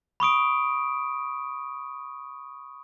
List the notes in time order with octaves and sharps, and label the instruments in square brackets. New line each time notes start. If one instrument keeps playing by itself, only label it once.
[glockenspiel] B5 C#6 D#6 D7